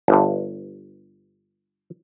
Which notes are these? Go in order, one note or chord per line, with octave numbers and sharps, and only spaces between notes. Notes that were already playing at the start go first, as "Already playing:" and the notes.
G1 G2